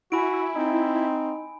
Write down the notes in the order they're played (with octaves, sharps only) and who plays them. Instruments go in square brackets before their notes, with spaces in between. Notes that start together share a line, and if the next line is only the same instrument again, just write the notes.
[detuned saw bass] E4 [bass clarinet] F#4 [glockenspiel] G#5 B5 D7
[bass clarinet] C4 [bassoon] D#4